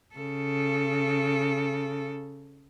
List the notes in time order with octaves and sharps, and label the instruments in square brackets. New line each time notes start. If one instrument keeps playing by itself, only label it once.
[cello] C#3 A4